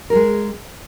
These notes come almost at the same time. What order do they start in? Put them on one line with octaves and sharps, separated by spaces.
A#4 G#4 G#3